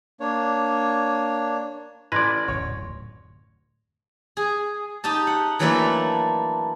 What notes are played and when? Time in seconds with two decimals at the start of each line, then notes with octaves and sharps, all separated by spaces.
0.20 A#3 D4 C#5
2.12 A1 B4 D5 C6 G#6 A#6
2.48 D1 F#2 C#5
4.37 G#4
5.04 D#4 G4 A5
5.27 F#5
5.59 E3 F#3 A3 A#3 D4 E4